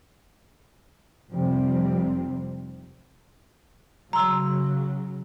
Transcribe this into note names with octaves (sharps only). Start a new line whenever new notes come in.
F1 C3 F3 G3 C4
C#3 F#3 A#5 C6 E6